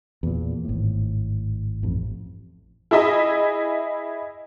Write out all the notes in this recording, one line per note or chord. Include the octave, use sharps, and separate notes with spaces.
E2 A#2
G#1 A2
A1 F2
E4 G#4 D#5 E5